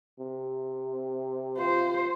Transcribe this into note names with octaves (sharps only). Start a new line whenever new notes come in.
C3
F4 C5